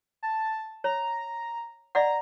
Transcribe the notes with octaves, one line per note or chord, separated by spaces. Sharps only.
A5
C#5 A#5
D5 D#5 F#5 A#5